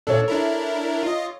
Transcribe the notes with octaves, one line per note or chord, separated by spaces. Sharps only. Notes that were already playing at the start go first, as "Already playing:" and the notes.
A#2 D4 A4 C#5
D4 E4 A#4
F4 D#5